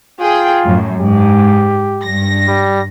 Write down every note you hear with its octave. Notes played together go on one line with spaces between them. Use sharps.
F4 G#4 G5
F#2 A2
G#2 G4
G2 A#6
G3